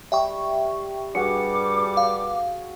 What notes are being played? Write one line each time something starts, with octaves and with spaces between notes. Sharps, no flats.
G3 E5 G5 C#6
G2 G3 F#4 G#4 F#5 D6 C#7
F5